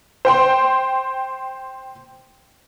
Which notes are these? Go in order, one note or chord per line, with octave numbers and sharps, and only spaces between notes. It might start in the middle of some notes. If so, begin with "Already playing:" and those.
C5 G5 C6